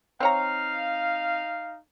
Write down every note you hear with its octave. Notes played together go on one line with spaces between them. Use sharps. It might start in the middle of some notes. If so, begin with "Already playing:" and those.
C4 D#4 C#5 F5 A#5